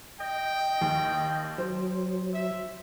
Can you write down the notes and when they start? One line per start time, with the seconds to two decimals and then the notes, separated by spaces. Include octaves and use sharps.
0.20 D#5 G5
0.81 D#2
1.58 F#3 C5
2.33 E5